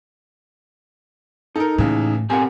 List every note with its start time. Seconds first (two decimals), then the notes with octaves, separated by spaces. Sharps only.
1.56 D#4 A4 A#4
1.78 D#2 A2 C#3 E3
2.30 B2 C4 G4 A#4 F#5 G#5